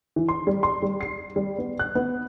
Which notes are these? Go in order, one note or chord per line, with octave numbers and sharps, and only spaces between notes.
E3
C6
G3
C6
G3
C7
G3
B3
F#6
B3